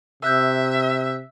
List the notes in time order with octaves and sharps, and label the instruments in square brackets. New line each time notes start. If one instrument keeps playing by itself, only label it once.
[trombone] C3 [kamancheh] E5 [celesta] E6 F#6 G6